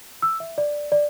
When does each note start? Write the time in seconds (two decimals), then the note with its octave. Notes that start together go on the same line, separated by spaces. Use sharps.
0.22 E6
0.40 E5
0.58 D5
0.92 D5